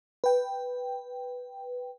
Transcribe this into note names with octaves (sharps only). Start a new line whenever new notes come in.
B4 G5